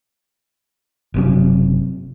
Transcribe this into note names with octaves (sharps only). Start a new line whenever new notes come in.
F#1 C3 F#3